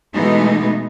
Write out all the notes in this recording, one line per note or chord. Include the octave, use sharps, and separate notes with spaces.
B2 E3 G#3 A3 B3 D#4